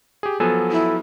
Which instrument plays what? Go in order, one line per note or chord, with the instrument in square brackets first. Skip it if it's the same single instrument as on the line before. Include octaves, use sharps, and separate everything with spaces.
[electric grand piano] G4 G#4
[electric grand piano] F3 F#3 B3 [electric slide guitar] A4 G#5
[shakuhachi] E4